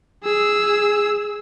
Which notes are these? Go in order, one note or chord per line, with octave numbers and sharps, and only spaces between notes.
G#4 E6